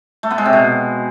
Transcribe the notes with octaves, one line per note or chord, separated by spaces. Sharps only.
A3
B3
G#3
C3
B2